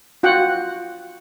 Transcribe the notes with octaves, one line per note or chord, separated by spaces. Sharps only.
F4 F#4 F#5 G5